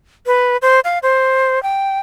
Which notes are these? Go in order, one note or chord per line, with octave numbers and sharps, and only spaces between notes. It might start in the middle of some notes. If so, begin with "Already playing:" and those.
B4
C5
F5
C5
G5